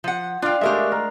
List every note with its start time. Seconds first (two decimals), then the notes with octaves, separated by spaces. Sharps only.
0.04 F3 F#5
0.42 D4 F4 F5 G5
0.61 G#3 A3 G4 A#4 E5
0.92 A#4